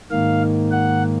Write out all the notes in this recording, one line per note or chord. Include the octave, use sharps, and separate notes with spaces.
G#2 D#3 A#3 F5
F#5